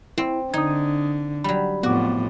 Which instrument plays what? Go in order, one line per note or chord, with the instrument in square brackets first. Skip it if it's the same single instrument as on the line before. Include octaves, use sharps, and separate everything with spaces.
[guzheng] C4 [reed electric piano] E4
[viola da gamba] D3 [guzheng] D#4 [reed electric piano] D#6 G#6
[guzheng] F#3 G3 [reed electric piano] B5
[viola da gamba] F2 A2 [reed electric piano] B3 D6 [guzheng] F#4